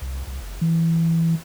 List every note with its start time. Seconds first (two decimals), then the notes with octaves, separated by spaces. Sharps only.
0.01 C2
0.27 C2
0.40 F#1
0.61 E3